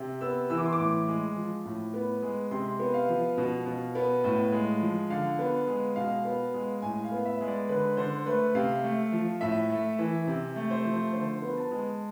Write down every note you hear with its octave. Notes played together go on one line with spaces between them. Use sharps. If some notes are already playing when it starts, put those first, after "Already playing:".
Already playing: C3
B3 E6
E3 E6
D6
C6
D6
A2
G#3
F3
A2
B3
G#3
C3 C6
B3
F5
F3
B2
B2
B3
A2
G#3
F3
D3 F5
B3
G#3
B2 F5
B3
G#3
A2 G#5
F5
B3
E5
G#3
D5
D3 B4
D3 C5
A3 B4
C3 F5
A3
F3
A2 E5
A3
E3
C3
A3
C5
F3
D3 C5
B3
A5
G#3